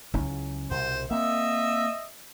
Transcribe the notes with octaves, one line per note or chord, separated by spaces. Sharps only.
C#2 F#3 C#4 E4
C2 B2 C5
A#3 C4 D#5 E5